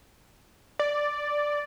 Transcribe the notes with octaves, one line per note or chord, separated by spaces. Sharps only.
D5